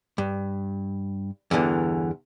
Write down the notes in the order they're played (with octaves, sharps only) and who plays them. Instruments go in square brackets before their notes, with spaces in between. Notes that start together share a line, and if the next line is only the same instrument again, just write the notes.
[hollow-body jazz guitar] G2
E2 G2 D3 E3